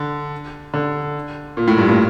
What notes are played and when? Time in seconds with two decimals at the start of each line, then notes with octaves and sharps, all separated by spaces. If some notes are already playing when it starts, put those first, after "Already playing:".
Already playing: D3
0.74 D3
1.57 A#2
1.67 A2
1.78 G2
1.89 A#2